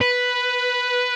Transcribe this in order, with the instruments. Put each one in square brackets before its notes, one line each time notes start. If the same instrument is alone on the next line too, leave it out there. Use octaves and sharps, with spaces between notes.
[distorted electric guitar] B4